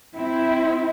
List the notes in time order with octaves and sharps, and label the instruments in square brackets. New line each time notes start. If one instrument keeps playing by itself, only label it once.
[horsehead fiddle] C4 [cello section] E4